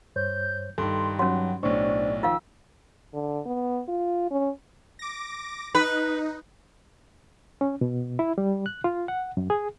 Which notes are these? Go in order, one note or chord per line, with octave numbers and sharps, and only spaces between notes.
G2 C5 C#5 G6
G2 D#3 A4 C6
F#3 C#4 F#4 F#5
B1 A2 D4 C5 D5 C#6
D#3 F3 F4 F5 E6
D3
B3
F4
C#4
D6 A#6
D#4 B4
C#4
B2
E4
G3
F#6
F4
F#5
F#2
G#4